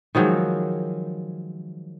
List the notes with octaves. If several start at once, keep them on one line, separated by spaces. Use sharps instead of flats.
D#3 F3 F#3 G#3